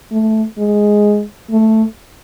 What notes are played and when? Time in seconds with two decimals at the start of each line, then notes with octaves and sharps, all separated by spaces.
0.11 A3
0.58 G#3
1.51 A3